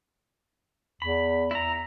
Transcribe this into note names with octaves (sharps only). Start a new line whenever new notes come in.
E2 B5
E4 A#5